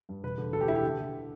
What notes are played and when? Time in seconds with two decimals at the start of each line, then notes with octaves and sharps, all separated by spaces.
0.09 G2
0.24 E1 B4
0.38 D3
0.53 D2 A4
0.61 G4
0.68 D3 E4
0.75 G4
0.83 D3
0.98 D3